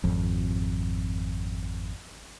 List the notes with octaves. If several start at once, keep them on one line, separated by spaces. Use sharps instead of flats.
G#1 F2